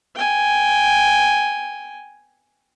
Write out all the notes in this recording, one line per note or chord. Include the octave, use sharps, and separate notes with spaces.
G5 G#5